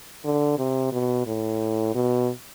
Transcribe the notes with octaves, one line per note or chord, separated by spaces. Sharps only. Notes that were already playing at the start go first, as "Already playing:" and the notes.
D3
C3
B2
A2
B2